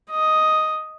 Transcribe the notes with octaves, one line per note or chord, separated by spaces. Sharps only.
D#5